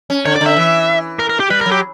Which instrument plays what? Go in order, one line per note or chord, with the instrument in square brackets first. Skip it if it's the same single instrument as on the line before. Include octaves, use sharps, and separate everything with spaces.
[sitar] C#4
[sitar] D3 [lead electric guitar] C#5
[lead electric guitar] D5
[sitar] D3
[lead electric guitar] E5
[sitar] E3
[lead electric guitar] A#4
A#4
G4
[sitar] G3 [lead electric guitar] B4
[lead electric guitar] A#4
[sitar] F#3
[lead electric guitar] G4